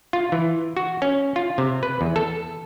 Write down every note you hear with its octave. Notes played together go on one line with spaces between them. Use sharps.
F4
E3
F#4
C#4
F4
C3
B4
E2
A4